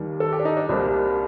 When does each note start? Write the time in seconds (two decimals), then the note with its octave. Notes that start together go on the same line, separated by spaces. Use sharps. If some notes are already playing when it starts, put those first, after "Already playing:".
Already playing: D#2 D#3 G3 A#3
0.20 A4
0.32 G4
0.39 D4
0.45 D#4
0.57 D4
0.69 C2 C3 G3 A#3 D4